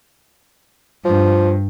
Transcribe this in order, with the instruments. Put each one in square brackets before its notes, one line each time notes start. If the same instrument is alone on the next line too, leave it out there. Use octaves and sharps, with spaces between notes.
[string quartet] G2 [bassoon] F3